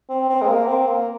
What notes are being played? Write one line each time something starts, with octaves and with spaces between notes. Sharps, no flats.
C4
C4
G#3
A#3
C4
A#3